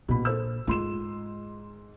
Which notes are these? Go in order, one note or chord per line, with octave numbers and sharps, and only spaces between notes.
A#1 B2 B5
A4 C5 E6
G#2 F4 C6 E7